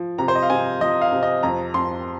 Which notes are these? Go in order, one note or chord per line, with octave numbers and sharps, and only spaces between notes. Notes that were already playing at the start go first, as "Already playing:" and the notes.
Already playing: F3
C3 A#5
C5
D#5
F5
C3 G#5
F3 D#5
F5
C3
D#5
F2 A#5
F2 C6